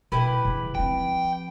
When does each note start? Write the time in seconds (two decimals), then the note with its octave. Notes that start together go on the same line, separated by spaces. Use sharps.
0.12 B2 E4 G4 B4
0.45 C#3 E3
0.75 F3 C4 G5